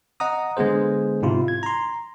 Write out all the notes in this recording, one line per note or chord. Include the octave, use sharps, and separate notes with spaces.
D#5 F#5 A#5 D#6
D3 G#3 B3 G#4 C5
G#2 C3 E4 F4
G#6
A#5 C6